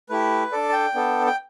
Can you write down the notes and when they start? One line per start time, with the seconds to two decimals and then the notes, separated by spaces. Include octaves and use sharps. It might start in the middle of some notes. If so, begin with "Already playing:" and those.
0.09 A3 E4 G4 B4
0.52 D4 A4 D5
0.69 A5
0.73 G5
0.95 B3 D4 A4
1.27 G5